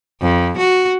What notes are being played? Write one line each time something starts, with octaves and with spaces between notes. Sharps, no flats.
F2
F#4